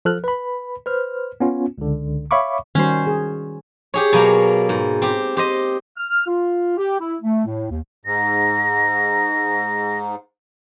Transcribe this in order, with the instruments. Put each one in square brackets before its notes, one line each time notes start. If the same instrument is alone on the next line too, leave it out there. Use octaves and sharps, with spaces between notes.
[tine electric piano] F3 A4 F6 F#6
B4 B5
B4 C5 F6
B3 C#4 F4
C#2 D3
C#5 E5 F5 B5 C#6 D6
[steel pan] D#3 G3 F#4 [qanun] C#4 C5
[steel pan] G#4
[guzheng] G4 G#4 C#5
B2 F#3 A#3
G#2
C4 G4
G4 C5 D#5
[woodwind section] F6
F4
G4
E4
A3
A2
D#2
[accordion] G#2 [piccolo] A#6